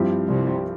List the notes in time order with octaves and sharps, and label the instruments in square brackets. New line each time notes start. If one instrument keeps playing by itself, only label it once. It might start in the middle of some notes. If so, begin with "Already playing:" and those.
Already playing: [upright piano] G2 F3 C4 E4 G4
[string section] C2 C3